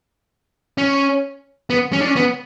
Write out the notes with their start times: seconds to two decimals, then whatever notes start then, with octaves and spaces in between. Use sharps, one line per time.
0.78 C#4
1.70 B3
1.93 C#4
2.00 D4
2.07 C#4
2.16 B3